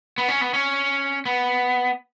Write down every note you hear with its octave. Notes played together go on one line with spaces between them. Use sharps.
B3
C#4
B3
C#4
B3